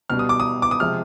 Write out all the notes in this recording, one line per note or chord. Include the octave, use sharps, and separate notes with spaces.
B2 G3 F6
D#6
D6
D#6
D6
D#6
C3 F3 G#3 F6